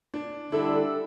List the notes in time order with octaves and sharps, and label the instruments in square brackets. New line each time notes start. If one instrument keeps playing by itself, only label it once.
[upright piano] D4
[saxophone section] D3 G3 E4 A4 [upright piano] D4